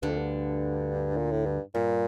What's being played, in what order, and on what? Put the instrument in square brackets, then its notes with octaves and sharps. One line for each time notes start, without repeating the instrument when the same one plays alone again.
[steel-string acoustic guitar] D2 D3 [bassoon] G2
[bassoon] F2
G2
A#2
A2
G2
[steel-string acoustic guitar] G2 [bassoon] A#2